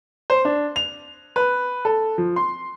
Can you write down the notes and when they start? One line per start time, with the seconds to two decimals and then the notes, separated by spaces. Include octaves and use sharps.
0.30 C5
0.45 D4
0.76 F7
1.36 B4
1.85 A4
2.18 F3
2.36 C6